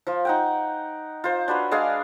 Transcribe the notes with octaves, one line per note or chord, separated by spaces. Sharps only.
F3 F4
D#4 F#5 G5
F4 C5
D4 F#4 B4 C#5
G#3 D4 G#4 F5